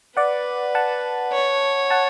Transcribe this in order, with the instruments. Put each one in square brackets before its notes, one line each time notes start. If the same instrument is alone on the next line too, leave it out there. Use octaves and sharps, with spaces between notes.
[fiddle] B4 [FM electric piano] D5 F#5
[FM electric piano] F#5 A5
[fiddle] C#5
[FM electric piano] F#5 A5